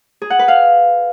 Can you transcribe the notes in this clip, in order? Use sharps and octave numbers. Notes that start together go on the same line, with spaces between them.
G#4
F#5
B4
F5